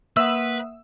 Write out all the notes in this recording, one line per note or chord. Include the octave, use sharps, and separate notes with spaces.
A#3 B4 E5 F#5 D#6 E6